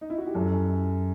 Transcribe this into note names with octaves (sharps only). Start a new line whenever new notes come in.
D#4
E4
F#4
G4
F#2 A4